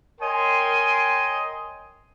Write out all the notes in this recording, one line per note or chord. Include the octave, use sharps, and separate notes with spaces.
A#4 C#5 D#5 G5 G#5 C6